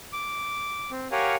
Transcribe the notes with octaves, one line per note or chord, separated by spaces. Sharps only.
D6
C4
G4 A#4 C#5 F5 F#5 G#5